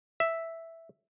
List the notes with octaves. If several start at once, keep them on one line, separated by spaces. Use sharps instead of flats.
E5